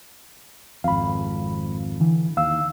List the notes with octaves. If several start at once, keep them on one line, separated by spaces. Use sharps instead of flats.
G#1 F2 F5 B5
D3 E3
D#2 F5 E6